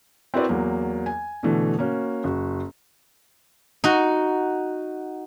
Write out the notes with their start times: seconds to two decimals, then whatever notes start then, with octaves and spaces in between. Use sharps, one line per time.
0.34 C4 E4 F#4 A#4 B4 D5
0.49 E2 F#3 A#3
1.06 G#5
1.43 B2 D3 E3 A3
1.79 A#3 C#4 F#4
2.24 F#1 F#4
3.84 D#4 F#4